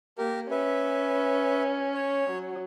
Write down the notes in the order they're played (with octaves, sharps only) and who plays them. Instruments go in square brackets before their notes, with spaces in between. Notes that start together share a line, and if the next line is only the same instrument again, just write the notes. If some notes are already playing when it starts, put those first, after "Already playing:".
[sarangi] A#3 [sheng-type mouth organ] G4 A#4
[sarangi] C#4 [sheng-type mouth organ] B4 E5
[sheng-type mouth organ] C#5
[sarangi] F#3